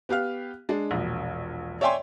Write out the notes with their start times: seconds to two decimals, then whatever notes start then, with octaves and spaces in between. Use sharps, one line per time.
0.09 B3 G4 F5 F6
0.69 G#3 D4
0.91 E1 A#1
1.81 C#5 D5 E5 G5 G#5 C6